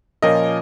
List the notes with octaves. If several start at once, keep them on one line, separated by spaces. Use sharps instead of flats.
A#2 F3 C#4 F4 A#4 D#5